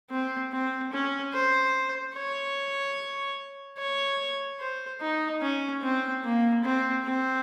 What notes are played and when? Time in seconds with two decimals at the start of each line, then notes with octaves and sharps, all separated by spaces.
0.10 C4
0.52 C4
0.93 C#4
1.34 C5
2.15 C#5
3.78 C#5
4.60 C5
5.01 D#4
5.41 C#4
5.82 C4
6.24 A#3
6.64 C4
7.05 C4